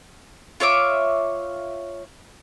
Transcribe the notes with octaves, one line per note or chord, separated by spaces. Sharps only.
F4 C#5 E5 D6